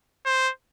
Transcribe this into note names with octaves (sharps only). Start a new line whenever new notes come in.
C5